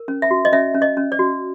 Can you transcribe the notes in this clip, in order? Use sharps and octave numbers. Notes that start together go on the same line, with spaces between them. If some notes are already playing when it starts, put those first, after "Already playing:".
Already playing: A#4
C#4
E5
F#4
D#5
C#4 E5
C#4
D#5
C#4
D5
F#4